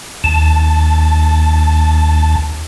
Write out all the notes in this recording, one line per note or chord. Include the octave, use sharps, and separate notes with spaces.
D#2 A5